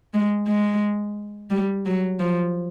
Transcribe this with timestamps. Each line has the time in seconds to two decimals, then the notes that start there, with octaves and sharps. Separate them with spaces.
0.14 G#3
0.48 G#3
1.50 G3
1.86 F#3
2.20 F3